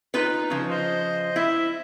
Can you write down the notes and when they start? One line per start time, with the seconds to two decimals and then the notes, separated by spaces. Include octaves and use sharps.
0.14 D#4 F4 B4
0.50 C#3 F3
0.70 C5 D#5
1.36 E4 E5